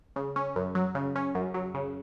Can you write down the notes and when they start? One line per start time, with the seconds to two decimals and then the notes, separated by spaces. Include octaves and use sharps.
0.16 C#3
0.36 C#4
0.56 F#2
0.75 F#3
0.95 C#3
1.16 C#4
1.35 F#2
1.54 F#3
1.74 C#3